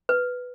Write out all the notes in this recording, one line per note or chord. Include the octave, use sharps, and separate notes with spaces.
B4